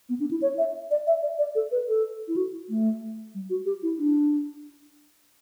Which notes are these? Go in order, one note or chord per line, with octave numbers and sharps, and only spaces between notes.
B3
D4
E4
C#5
E5
D5
E5
D5
D5
A4
B4
A4
E4
F#4
A3
G3
F#4
G4
E4
D4